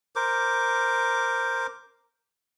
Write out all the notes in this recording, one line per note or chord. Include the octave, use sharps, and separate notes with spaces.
A#4 C5 D6